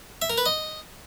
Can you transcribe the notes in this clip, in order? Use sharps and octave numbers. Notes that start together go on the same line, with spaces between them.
E5
A#4
B4
D#5